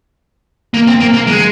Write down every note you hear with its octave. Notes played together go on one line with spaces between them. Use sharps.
A#3
C4
A#3
A#3
G#3